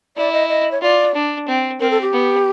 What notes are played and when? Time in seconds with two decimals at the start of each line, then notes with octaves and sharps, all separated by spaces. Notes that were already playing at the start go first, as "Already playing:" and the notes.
0.17 E4 D5
0.33 D#5
0.49 D#5
0.71 C#5
0.82 F4 D5
1.14 D4
1.48 C4
1.80 C4 A#4
1.91 A4
2.02 G4
2.13 B3